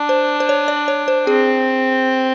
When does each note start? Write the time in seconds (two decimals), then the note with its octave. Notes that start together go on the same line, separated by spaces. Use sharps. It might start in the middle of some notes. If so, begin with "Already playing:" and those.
Already playing: D4
0.09 C5
0.40 C5
0.49 C#5
0.68 D5
0.88 C#5
1.08 C5
1.27 C4 G#4